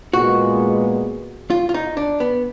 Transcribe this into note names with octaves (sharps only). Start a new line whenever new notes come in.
A#2 G#3 B3 F#4
F4
F4
D#4
D4
B3